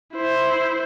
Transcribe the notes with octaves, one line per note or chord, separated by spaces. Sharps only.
E4 C5